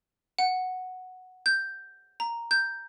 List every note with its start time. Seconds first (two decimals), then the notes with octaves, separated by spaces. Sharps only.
0.39 F#5
1.46 G6
2.20 A#5
2.51 G6